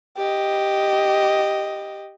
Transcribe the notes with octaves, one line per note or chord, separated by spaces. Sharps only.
G4 D#5